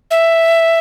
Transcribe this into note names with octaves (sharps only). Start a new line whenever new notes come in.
E5